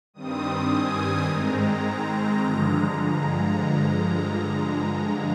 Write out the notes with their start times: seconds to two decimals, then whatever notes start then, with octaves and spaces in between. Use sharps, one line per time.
0.14 G2 D#3 G3 C4 D#6
0.70 G#5
1.26 G#2 D#3 G#3 C4 A#5
2.38 G2 D3 F3 G#3
2.94 A#5